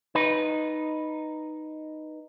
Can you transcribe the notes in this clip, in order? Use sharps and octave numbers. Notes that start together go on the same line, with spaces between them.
D#4 B4